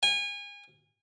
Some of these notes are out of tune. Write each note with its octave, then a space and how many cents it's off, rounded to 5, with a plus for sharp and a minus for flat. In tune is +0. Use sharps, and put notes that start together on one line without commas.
G#5 -30